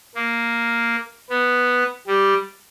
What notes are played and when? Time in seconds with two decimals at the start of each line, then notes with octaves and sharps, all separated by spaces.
0.15 A#3
1.29 B3
2.07 G3